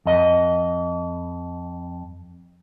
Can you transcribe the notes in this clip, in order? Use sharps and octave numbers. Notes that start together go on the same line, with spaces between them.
F2 D#5